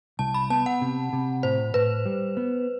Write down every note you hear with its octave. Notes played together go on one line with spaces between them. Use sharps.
C2 A5
B5
B3 A5
F#5
C3
C3
A2 C5
A2 B4
G3
B3